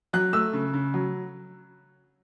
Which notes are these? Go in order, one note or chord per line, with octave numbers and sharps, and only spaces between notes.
F#3 F#6
A3 E6
C#3
C#3
F#3